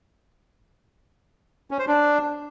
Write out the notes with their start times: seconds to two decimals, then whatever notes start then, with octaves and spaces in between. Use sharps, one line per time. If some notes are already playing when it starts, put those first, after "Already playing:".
1.71 C#4
1.79 C5
1.87 D4